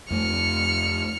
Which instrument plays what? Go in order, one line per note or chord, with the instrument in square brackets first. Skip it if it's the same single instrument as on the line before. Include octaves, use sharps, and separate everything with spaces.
[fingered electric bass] F2 A3 [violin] F6 C#7